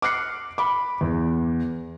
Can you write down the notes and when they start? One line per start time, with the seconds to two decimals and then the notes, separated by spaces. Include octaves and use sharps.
0.02 D6 F6 F#6 C7 C#7
0.58 B5 D6
1.01 E2